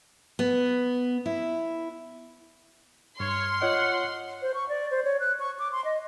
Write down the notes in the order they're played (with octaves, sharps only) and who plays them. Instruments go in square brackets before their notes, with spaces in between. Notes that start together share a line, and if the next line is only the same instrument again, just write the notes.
[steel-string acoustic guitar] B3
E4
[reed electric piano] G2 [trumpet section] C#5 [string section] C6 [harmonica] F6
[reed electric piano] F4 C#5 D#5 [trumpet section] F#5
[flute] C5
C#6
D5
C5
C#5
F#6
C#6
D6
C6
D#5